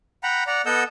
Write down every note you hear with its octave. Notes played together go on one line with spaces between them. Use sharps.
F#5 G5 A#5 B5
D5 F#5 A#5
B3 A4 D#5 F#5 E6 G6